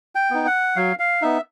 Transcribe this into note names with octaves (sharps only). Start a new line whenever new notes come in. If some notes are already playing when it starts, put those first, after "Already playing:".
G5
B3 D#4
F#5
F#3 F5
F5
B3 D#4 E5